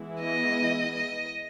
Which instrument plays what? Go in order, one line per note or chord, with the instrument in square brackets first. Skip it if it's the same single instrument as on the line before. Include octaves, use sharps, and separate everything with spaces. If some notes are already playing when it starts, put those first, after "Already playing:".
Already playing: [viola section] E3 G#3 B3 E4
[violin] D#5
D#5